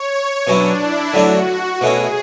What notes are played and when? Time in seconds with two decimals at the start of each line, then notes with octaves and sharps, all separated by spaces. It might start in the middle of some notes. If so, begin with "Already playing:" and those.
Already playing: C#5
0.47 B2 F#3 C#4 D4 E4
0.81 E4
1.13 D3 F#3 A3 D4 F#4
1.81 B2 A3 C#4 E4 G#4